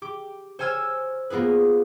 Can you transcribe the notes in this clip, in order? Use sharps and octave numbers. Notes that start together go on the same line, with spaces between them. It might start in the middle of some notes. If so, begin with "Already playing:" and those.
G4 D6
C5 C#5 G#5 E6 F6 G#6
A#3 B3 F4 G#4 B4